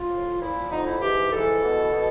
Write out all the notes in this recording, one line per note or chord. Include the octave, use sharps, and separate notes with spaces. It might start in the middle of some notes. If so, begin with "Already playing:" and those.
Already playing: F4
A2 F3
A#2 F3 E4
F2 D3 F3 D#4
E4
G#2 E3 G4
G#2 E3 A4
E2 B2
B2